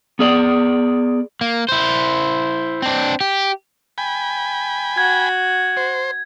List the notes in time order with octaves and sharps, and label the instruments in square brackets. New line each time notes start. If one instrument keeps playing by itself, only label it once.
[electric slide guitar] B3 G#4 D5
[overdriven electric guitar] A#3
E4 C5
C4 D4
G4
[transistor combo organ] G5 G#5 B5
[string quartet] F#4 [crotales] G#6
[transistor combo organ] C5